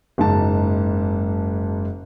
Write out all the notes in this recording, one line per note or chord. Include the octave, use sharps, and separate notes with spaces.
F#1 G#2 A5